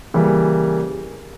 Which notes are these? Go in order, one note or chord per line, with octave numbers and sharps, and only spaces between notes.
C#3 E3 G3 A#3